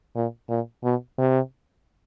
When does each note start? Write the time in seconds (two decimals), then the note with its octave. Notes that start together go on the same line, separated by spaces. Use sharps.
0.15 A#2
0.49 A#2
0.84 B2
1.18 C3